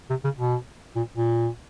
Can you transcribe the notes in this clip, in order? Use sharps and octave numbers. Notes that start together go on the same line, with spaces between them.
C3
C#3
B2
A#2
A#2